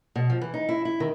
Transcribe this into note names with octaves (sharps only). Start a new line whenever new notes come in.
B2
F3
E3
D#4
E4
E4
D#3